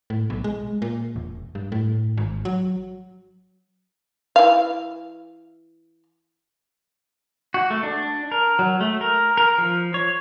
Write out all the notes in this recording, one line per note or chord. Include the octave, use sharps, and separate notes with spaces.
A2
B1
G#3
A#2
E1
G2
A2
G#1
F#3
E3 F5
F#4
A3
D4
A#4
F#3
A3
A#4
A#4
F3
C#5